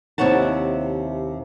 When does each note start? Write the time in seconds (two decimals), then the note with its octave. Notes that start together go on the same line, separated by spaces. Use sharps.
0.18 D#2 C3 E4 C#5 F#5 A5